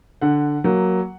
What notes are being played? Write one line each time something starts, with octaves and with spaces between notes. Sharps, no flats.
D3 F#5
F#3 A#3